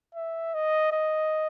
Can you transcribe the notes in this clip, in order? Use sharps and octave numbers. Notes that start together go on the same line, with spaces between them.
E5
D#5
D#5